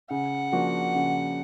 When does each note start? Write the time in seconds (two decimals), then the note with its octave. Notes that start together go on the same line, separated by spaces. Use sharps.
0.10 C#3 F#5
0.52 F3 A#3 D4 F#4
0.95 C#3